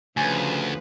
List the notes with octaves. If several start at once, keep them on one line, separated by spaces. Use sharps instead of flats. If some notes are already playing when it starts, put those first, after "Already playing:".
D2 C#3 F3 B4 G#5